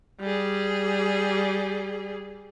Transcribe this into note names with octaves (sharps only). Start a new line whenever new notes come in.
G3 G#4